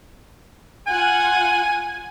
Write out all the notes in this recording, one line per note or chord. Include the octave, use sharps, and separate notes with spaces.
F4 F#5 G#5